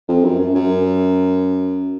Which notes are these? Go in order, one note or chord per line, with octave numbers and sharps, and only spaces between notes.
F2
F#2
F#2
F#2